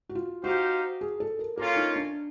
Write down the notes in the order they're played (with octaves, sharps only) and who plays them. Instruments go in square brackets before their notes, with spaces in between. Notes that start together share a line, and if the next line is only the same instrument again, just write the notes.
[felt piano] F#4
F4
[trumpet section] D#4 G4 C5 F5 [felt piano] F#4
[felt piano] G#4
A4
A#4
[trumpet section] A#3 C#4 F4 [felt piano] A4
[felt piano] D#4
D4